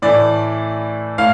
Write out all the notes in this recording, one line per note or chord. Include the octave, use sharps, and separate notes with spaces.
A2 E3 A3 D5
A2 F5